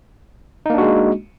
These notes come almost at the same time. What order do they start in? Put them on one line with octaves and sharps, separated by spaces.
D#4 A#3 D4 F#4 G#3